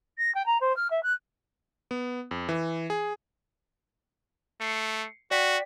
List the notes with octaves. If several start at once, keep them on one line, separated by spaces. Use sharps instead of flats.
A#6
G5
A#5
C5
F6
E5
F#6
B3
F2
E3
G#4
A3 C7 C#7
F#4 D5 G5 B6